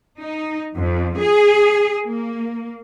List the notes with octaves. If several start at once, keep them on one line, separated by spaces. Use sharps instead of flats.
D#4
F2
G#4
A#3